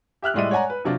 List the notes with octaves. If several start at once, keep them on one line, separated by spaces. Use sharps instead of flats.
G4 E5 F6 F#6
A2 G3 G#3 D5 E5 D#7
C#5 D5 F#5 G#5 A#5
B4
C3 F#3 D4 F4